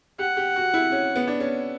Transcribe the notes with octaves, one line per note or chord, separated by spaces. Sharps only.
G4 F#5
G4
F#4
E4
C#4
B3
D4
C#4